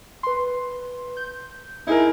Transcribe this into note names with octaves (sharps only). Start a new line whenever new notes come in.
B4 C6
G6
D#4 E4 G#4 A#4